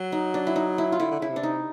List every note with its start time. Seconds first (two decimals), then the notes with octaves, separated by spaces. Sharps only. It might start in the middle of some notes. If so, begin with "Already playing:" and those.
Already playing: F#3
0.12 D#4
0.34 D4
0.47 E4
0.56 D#4
0.78 E4
0.92 F4
1.00 D3 E4
1.11 D3
1.20 C#3 E4
1.29 C3
1.36 D4
1.43 D#4